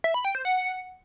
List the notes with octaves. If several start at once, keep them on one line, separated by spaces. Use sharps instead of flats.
E5
B5
G5
C5
F#5